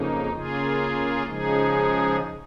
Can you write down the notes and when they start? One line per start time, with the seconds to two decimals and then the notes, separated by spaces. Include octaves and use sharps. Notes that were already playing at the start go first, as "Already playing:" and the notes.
Already playing: F2 C#3 A#3 D#4
0.32 C#3 A#3 F4 G#4
1.26 C#3 F3 G#3 D#4 G#4